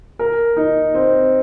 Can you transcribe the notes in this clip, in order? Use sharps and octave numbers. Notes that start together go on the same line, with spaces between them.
A#4
D#4
C4